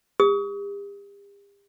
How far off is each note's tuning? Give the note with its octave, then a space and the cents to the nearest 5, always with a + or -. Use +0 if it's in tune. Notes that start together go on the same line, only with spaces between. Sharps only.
G4 +40 D#6 +35